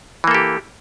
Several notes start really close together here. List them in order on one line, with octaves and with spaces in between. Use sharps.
E3 A#3 A4 G4